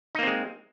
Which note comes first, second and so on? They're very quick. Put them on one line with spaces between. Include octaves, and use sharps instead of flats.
D#4 A#3 C4 G#3